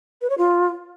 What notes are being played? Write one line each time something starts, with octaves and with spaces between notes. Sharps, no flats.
B4
C#5
F4